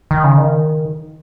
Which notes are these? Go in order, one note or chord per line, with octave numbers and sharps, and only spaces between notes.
D#3
C#3
D#3